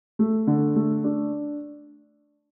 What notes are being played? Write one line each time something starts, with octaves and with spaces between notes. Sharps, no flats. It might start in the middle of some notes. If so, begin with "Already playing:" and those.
A3
D3
A3
D4